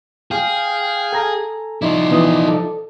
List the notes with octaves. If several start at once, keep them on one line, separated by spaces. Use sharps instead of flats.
G#4 F5 G5
A4 G#5 A#5
F3 D#4 E4 C5 D5
B2 E3 D#6
A4